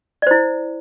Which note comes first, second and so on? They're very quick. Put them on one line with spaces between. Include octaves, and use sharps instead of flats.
D5 C5 E4